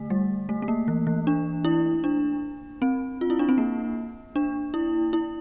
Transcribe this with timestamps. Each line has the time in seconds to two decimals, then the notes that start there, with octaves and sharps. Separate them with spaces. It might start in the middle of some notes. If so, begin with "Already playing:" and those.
Already playing: D3 A3
0.10 G3
0.49 A3
0.62 A3
0.68 A#3
0.88 E3
1.07 E3
1.27 D4
1.64 E4
2.04 D4
2.82 C4
3.21 F4
3.30 E4
3.39 D4
3.49 C4
3.58 A#3
4.36 D4
4.74 E4
5.13 E4